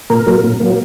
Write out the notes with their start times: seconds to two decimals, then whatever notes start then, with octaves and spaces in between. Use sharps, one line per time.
0.10 A#2 A#4
0.26 F#3 A#3
0.44 A#2
0.60 F#3 A#3